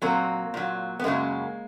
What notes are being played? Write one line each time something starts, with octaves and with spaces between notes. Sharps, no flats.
A#2 F#3 A#3 C4
A#2 F#3
B3
F#2 C#3 F#3 G#3 A#3